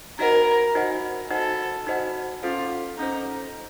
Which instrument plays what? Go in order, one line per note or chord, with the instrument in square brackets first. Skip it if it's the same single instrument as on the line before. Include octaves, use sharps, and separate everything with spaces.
[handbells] D#4 F#4 C5 D#5 F#5 [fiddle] A#4
[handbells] D#4 F#4 C5 D#5 F#5
[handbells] D#4 F#4 C5 D#5 F#5 [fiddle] A4
[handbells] D#4 F#4 C5 D#5 F#5
[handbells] C#4 A4 C5 [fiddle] F4
[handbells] C#4 A4 C5 [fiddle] D#4